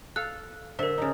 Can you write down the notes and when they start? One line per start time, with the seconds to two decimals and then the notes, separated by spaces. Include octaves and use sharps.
0.16 A4 F5 F#6
0.79 D3 A#4 C5 E5
0.98 C#3 D#4